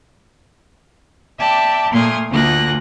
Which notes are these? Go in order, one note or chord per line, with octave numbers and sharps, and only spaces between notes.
D5 E5 G5 A5 D6
A#2 A3 C6 D#6 F6 G#6
D2 D3 A#3 F4 F#6 A#6